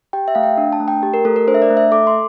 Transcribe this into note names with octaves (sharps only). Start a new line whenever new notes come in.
G4 G5
E5
A3 F5
G5
D4
A5
A3
G5
G4
A#4
A3 A4
A#4
D4 C5
E5
D5
A3
E5
A4 D6
C6